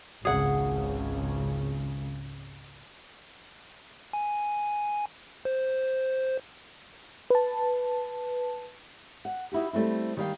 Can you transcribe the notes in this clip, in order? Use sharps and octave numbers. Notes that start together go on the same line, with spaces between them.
G#1 C#2 C#3 G#4 F#5
G#5
C5
B4 A5
F#5
D#4 E4 F#4 G4
G3 A3 C4 E4
D#3 G3 A#3 B4 F5 G5